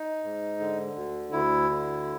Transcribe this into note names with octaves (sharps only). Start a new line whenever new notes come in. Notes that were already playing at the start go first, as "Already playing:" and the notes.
Already playing: D#4
G#2
D3
D2
D2 E4
D3